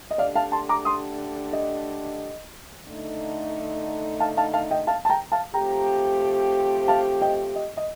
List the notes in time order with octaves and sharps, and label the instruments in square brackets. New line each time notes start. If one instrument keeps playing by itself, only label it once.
[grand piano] D#5
[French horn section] D3 A3 D4 G4 [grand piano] D5 F5
[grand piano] F5 A5
A5 C6
A#5 D6
C6 D#6
D#5
[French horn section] D3 A3 D#4
[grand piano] F5 A5
F5 A5
F5 A5
D#5 G5
F5 A5
A5
G5 A#5
F5 A5
[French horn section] F3 A3 C4 G4 [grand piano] G5 A#5
[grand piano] F5 A5
D#5 G5
D#5
D#5